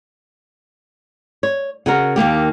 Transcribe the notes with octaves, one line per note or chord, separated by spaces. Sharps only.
C#5
C#3 F#4 A#4
D#2 D#3 A#3 G4